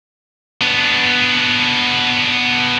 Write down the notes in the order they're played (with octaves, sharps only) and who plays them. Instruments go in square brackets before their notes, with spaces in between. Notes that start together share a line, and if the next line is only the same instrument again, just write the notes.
[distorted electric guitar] B3 D4